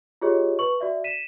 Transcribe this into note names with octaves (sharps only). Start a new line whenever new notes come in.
F4 G4 G#4 C#5 D#5
B4 C#6 F#7
F#4 D5 E5
B6 D#7 E7